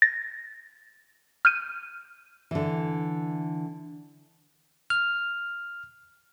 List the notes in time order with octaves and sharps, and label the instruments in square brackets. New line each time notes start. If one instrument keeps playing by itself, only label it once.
[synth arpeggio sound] A6 A#6
F6 G6 D#7
[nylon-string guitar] D3 E3
[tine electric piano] F6